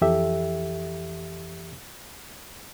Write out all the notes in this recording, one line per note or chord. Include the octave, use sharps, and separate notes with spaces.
F2 E3 G4 A4 E5